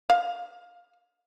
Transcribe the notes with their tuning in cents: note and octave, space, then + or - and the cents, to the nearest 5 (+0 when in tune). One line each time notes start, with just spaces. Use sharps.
F5 +15